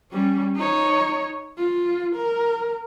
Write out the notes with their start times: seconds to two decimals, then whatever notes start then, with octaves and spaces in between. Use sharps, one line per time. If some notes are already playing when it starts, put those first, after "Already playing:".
0.12 G3 C#4
0.56 D#4 C#5
1.58 F4
2.16 A#4